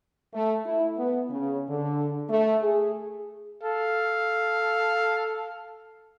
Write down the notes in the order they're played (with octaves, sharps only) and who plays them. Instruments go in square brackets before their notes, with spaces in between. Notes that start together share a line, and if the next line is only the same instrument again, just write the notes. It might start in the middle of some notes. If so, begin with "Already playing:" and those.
[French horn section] A3
E4
B3
C#3
D3
A3
G#4
[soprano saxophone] A4 [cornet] F5